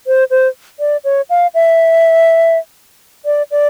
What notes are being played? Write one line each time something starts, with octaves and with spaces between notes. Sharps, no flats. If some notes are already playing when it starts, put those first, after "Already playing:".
C5
C5
D5
C#5
F5
E5
D5
D5